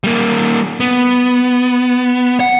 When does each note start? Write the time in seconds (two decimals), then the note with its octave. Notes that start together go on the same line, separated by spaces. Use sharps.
0.04 G3 A#3
0.80 B3
2.40 F#5